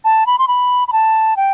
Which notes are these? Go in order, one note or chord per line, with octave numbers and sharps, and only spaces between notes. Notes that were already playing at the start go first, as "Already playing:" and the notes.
A5
B5
C6
B5
B5
A5
G5